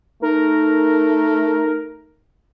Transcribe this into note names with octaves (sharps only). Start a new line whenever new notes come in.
A3 D#4 A#4